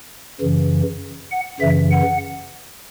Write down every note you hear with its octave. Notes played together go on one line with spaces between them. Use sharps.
F#2 C#3 E3
F#5
F#2 C#3 E3 E5
F#5